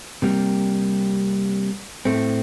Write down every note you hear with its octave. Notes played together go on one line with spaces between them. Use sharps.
C3 G3 A#3
A2 A3 C4